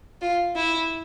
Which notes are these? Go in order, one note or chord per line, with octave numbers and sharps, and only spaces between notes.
F4
E4